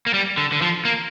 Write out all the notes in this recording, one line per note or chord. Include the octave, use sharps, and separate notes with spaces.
A#3
G3
D3
D3
F3
A#3